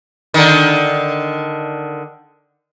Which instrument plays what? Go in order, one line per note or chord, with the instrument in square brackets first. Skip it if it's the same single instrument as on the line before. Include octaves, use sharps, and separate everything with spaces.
[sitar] D3 D#3